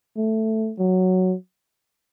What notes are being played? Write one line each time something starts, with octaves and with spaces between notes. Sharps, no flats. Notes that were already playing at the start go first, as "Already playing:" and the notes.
A3
F#3